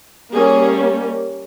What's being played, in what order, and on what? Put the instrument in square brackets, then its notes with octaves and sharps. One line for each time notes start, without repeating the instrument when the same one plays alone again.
[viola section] G3 A#3 C#4 G#4